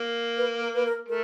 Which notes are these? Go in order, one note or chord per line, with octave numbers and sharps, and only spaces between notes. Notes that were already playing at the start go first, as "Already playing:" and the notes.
Already playing: A#3
B4
A#4
B4
A#4
A3 A#4